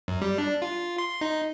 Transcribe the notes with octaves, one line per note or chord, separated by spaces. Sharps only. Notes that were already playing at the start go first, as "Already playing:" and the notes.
F#2
G3
D4
F4
C6
D#4